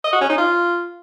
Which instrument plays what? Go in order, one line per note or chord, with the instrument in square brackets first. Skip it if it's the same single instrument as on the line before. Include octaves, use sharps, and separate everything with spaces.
[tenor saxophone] D#5
F#4
C#4
D#4
F4